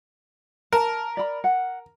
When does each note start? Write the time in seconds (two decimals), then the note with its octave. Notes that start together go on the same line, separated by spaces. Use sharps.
0.73 A#4 A5
1.17 D5 B5
1.44 F#5